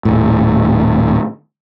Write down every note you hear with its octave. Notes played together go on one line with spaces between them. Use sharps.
D#1 A2